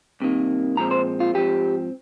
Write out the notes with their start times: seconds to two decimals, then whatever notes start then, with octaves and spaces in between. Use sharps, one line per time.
0.20 C2 C3 D#3 A#3
0.77 A#2 F3 G#3 C4 A#5
0.91 C5
1.20 F4
1.34 G#2 F3 C4 G4